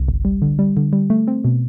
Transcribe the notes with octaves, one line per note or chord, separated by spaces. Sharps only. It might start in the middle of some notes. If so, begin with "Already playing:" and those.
Already playing: C2
G1
G3
D3
G3
D3
G3
A3
C4
B2